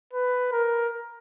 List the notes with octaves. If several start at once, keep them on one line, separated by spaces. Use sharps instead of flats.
B4
A#4